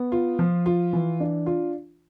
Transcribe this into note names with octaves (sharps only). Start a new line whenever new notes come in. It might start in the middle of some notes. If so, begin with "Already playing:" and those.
Already playing: B3
F4
F3
F4
E3
D4
F4